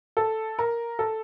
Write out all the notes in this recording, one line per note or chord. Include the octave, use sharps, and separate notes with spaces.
A4
A#4
A4